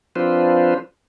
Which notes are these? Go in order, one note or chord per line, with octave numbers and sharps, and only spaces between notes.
F3 C4 D4 F4 B4 C5